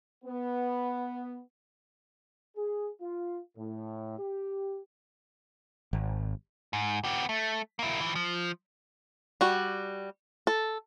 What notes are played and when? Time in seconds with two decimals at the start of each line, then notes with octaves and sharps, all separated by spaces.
0.25 B3
2.55 G#4
3.00 F4
3.57 A2
4.17 G4
5.93 G#1
6.73 G#2
7.04 B3 G4
7.29 A3
7.79 A#3 E4
8.01 E3 F3
8.15 F3
9.41 G3 F#4
10.47 A4